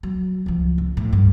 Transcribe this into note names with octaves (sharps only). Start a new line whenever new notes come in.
F#3
C#2 F3
C#3
A2
G2